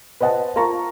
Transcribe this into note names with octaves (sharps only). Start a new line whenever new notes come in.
B4 C5 D#5 F#5 A5
F4 A#4 A5 A#5 C#6